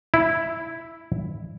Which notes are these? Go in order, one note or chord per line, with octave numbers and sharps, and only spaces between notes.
E4